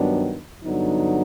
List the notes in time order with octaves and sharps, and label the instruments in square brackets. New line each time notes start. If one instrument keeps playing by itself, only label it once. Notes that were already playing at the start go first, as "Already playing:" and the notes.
Already playing: [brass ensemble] G2 D#3 F#3 B3 D4
G2 D3 F#3 B3 D#4